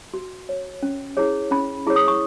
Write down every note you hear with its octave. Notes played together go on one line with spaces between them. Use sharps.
F#4
C#5
C#4
E4 G#4 C#5
C#4 B5
E4 G#4 C#5
D#6
C#6